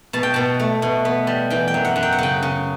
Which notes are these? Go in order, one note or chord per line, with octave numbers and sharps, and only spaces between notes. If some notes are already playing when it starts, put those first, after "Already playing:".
B2 A5
G5
B2 A5
A3
B2
B3
G3
E3 G5
G5
F#2
F#5
F#2
G5
F#5
C#3 G5
C#3